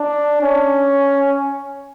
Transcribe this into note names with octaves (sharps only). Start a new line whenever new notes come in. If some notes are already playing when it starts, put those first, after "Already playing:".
Already playing: D4
C#4